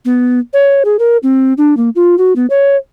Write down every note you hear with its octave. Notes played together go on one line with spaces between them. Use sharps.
B3
C#5
G#4
A#4
C4
D4
A#3
F4
F#4
B3
C#5